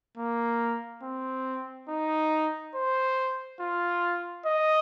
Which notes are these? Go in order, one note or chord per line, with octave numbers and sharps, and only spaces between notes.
A#3
C4
D#4
C5
F4
D#5